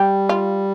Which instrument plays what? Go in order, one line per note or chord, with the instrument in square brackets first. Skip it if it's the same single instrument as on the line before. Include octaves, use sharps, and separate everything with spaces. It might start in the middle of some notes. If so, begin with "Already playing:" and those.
Already playing: [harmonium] G3 [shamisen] G4
[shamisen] F4